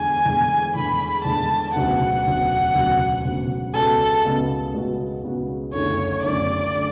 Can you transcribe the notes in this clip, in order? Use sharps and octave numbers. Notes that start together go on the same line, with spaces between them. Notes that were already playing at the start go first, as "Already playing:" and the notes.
Already playing: E2 D3 G#3 G#5
E2 D3 G#3
E2 D3 G#3 B5
E2 D3 G#3 A5
E1 D2 C#3 F#3 B3 F#5
E1 D2 C#3 F#3 B3
E1 D2 C#3 F#3 B3
E1 D2 C#3 F#3 B3
C#2 C#3 G#3 B3 F#4 A4
C#2 C#3 G#3 B3 F#4
C#2 C#3 G#3 B3 F#4
C#2 C#3 G#3 B3 F#4
F#1 F#2 D3 A3 C#5
F#1 F#2 D3 A3 D5
D3 A3